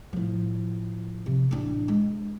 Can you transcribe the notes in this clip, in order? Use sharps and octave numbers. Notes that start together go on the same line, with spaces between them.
A2 F3
C3
A1 D4
G#3